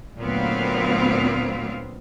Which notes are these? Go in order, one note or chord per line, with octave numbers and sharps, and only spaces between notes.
D2 A#2 F#3 B3 C4 F5